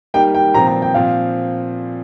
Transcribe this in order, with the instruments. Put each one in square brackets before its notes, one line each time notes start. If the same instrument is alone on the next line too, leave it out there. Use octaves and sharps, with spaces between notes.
[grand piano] G3 A#3 D#4 G4 A#4 [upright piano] G5
[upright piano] G5
[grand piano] A#2 F3 C4 [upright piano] A#5
[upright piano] A#5
G5
[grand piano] A#2 F3 C4 [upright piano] F5